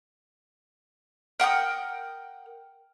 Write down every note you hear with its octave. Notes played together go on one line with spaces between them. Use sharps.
A#4 F#5 G5 D#6